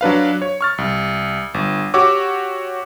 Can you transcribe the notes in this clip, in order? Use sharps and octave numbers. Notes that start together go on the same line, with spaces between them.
F#3 D4 B4 F5
C#5
C#6 F6 A6
C2
G1
F#4 G4 C#5 D6 E6